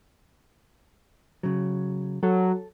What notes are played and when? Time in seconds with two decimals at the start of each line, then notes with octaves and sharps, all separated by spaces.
1.43 C#3 F#3
2.23 F#3 A4